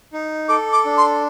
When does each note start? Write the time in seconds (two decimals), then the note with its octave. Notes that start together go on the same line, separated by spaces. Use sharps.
0.13 D#4
0.49 A4 D6
0.72 D6
0.85 D4
0.97 C6